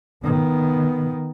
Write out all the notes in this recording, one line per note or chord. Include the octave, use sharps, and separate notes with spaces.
D#3 B3